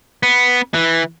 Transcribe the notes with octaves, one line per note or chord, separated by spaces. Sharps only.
B3
E3